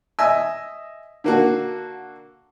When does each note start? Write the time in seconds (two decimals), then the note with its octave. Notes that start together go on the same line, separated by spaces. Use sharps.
0.19 D#5 E5 G#5 E6
1.24 D3 A#3 F#4